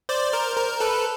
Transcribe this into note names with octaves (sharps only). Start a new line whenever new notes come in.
C5 D5
A#4 C5
A#4
A4 B4